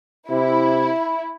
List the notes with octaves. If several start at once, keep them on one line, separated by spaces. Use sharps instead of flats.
C3 E4